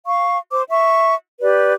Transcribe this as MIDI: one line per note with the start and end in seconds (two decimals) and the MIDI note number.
0.06 0.37 77
0.06 0.37 85
0.52 0.64 72
0.52 0.64 86
0.69 1.15 76
0.69 1.15 85
1.40 1.73 67
1.40 1.73 71
1.40 1.73 74